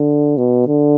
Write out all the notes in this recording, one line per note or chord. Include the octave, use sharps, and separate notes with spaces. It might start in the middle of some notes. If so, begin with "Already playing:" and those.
Already playing: D3
B2
D3